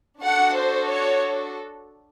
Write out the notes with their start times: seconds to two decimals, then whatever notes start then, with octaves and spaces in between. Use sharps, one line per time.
0.22 D4 F#4 A4 F#5
0.55 C5
0.89 C#5